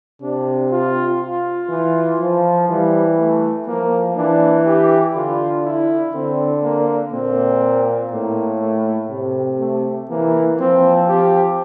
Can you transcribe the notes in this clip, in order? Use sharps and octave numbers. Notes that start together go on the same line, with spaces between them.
C3 D4
F4
F4
E3
F3
E3 G3
A3
F3 A#3
E3 D4
G4
D3 F4
E4
D3 C4
A#3
A#2 C4
A2 A#3
A3
C3
A3
E3 A#3
F3 C4
G4